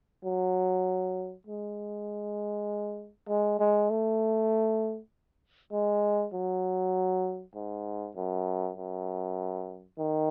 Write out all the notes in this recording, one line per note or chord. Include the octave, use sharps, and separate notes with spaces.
F#3
G#3
G#3
G#3
A3
G#3
F#3
G#2
F#2
F#2
D#3